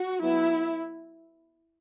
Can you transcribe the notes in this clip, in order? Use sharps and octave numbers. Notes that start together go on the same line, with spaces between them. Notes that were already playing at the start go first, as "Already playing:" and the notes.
Already playing: F#4
F#3 B3 E4